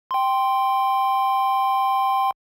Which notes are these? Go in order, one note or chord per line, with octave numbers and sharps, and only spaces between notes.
G5 C6